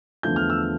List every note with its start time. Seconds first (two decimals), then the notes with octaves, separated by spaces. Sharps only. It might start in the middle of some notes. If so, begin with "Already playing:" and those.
0.23 E2 D3 F3 A3 G6
0.36 F6
0.50 E6